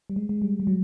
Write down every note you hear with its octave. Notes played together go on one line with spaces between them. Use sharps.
G3
G#3
G#3
G3
G3
F#3